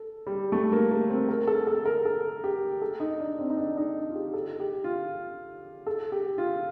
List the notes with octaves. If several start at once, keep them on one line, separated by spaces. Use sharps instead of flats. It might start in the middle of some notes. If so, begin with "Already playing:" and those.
Already playing: A4
G3
A3
A#3
A#3
C4
A#4
A4
A4
A#4
A4
G4
A4
D#4
D4
C4
D#4
D4
D#4
F4
G4
A4
G4
F4
A4
G4
F4